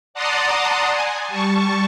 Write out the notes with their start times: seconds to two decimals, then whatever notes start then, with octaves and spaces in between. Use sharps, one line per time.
0.14 D5 F#5 A5 A#5 C6 D#6
0.91 G#5
1.28 G3 A5 C#6